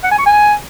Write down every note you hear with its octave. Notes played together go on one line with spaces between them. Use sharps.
F#5
G#5
C#6
G#5